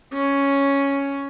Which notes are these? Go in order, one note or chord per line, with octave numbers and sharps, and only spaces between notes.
C#4